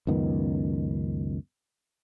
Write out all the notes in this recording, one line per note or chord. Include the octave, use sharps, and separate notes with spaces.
C#2 F#2 D#3 B3